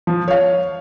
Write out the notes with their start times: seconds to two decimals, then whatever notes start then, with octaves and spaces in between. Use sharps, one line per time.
0.07 F3
0.28 C#5 F5